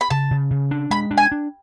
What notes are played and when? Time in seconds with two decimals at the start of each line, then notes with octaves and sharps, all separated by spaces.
0.01 B5
0.10 C#3 A5
0.31 C#3
0.51 C#3
0.71 D4
0.91 G#3 B5
1.11 D4
1.18 G#5
1.32 D4